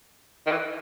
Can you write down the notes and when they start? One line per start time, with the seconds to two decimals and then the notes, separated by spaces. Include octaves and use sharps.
0.46 D#3
0.52 E3